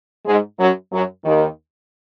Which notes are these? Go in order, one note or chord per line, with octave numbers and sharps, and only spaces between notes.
G#2 G#3
F#2 F#3
F#2 F#3
D#2 D#3